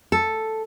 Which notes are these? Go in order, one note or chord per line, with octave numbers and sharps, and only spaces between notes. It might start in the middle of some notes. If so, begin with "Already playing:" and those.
A4